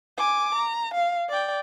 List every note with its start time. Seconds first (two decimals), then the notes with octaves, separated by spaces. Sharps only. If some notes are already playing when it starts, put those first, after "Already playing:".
0.18 G#5 D6
0.55 A#5
0.94 F5
1.29 D5 G5